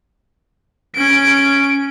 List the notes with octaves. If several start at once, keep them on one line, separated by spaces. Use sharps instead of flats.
C#4 D7